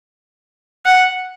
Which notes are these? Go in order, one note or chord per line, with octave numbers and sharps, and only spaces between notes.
F#5